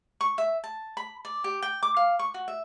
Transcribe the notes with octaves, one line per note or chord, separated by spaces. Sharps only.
C#6
E5
A5
B5
D5
G4
G5
D6
F5
C#6
F#4
E5